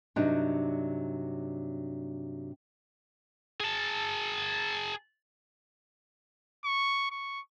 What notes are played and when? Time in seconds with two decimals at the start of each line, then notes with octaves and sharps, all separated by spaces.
0.16 G2 C3 F#3 G3 D4 D#4
3.60 G#4 A5
6.65 C#6
7.11 C#6